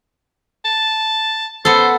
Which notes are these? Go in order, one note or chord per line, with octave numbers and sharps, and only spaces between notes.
A5
B3 A4 C5